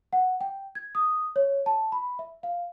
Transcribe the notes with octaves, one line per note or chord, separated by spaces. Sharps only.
F#5
G5
G#6
D#6
C#5
A5
B5
E5
F5